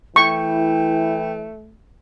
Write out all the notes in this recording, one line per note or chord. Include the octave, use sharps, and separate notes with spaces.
E3 A3 E4 G5 C#6